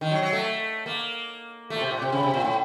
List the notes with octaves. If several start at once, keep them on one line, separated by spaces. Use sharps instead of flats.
D#3
F#3
F#3
A3
A#3
A3
A#2
C3
A#2
C3
C#3
C3
A#2
A2